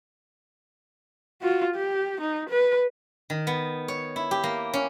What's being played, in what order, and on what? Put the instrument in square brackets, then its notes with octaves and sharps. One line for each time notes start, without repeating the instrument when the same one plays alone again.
[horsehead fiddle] F4 F#4
G4
D#4
B4
[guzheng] D#3
B3
C#5
E4
G4
A#3
C#4